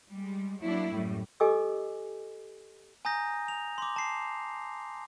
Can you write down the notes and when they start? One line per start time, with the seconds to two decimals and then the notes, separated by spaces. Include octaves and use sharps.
0.11 G3 G#3
0.62 F#3 A#3 D4 E4
0.90 F#2 A2 G3
1.40 G4 A4 D#5 G#5 D6 E6
3.05 G#5 A#5 D#6 G6 A#6
3.48 F7
3.78 C6 D6
3.96 A5 C7